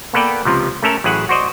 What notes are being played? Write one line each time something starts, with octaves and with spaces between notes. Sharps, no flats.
A#3 B3 A4 B4 D5 G5
C#2 C3 F3
A3 C#4 A4 A#4 E5
A1 F#3 E4 G#4 F#5
F#4 C5 D5 D#5